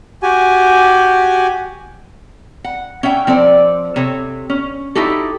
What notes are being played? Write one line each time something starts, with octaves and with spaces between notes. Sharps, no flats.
F#4 G4 G#5
F#5
C#4 E5 F#5 G5
F3 C4 A4 D5
C3 A4 C#5
C#4
D#4 E4 F#4 G4 A4